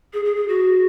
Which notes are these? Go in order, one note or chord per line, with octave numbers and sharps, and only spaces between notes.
G#4
G#4
G#4
F#4